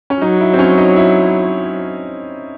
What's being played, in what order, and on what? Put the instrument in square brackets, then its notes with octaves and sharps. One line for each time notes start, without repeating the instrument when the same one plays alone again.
[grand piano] C#4
[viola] F#3 [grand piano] D#4
[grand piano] E4
C4
C#4
D#4
E4